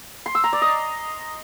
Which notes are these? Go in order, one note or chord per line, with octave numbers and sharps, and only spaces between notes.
C6
E6
A#5
D5
D#5